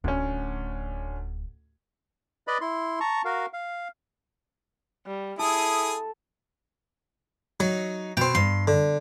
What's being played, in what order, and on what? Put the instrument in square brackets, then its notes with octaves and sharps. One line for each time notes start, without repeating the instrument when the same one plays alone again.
[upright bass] D1 [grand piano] D2 C#4
[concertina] B4 D5 D#5 B5
E4 C6
A5 A#5 C#6
F#4 A#4 F5
F5
[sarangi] G3
[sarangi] E4 [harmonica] G#4 D#6 [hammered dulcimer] A4
[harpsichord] F#3 [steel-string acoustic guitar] D#4
[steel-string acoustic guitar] B2 [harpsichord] C4 G5
[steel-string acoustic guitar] G2 [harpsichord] C6
[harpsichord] D3